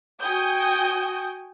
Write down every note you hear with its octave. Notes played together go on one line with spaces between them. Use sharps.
F#4 G5 G#5 D#6 G6